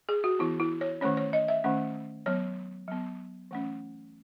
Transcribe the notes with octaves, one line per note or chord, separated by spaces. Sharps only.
G#4
F#4
E3 B3 E4
E4
C#5
D#3 A3 C#4 C#5
C#5
D#5
E5
D#3 A3 C#4
F#3 B3 C#5
F#3 B3
E3 A3 C#4